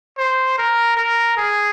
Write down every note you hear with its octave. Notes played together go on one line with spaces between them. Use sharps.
C5
A#4
A#4
G#4